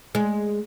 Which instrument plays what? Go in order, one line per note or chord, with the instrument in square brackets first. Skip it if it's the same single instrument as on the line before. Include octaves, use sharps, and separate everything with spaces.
[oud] G#3